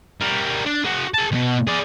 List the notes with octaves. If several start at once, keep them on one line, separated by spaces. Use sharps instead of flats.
G3 A#4
D4
F#4 G#4
G#4 A5
D2 B2
G#4 D5